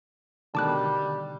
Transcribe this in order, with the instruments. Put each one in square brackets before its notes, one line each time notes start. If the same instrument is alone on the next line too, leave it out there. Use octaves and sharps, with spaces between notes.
[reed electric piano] B2 D3 D#3 [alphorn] G3 [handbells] A5 D6 F#6